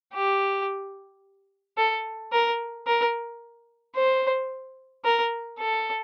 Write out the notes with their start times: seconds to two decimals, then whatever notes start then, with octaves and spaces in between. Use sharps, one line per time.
0.14 G4
1.78 A4
2.32 A#4
2.87 A#4
3.96 C5
5.05 A#4
5.59 A4